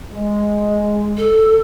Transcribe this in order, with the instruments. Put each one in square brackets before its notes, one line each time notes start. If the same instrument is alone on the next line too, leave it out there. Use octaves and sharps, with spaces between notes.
[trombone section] G#3
[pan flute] A4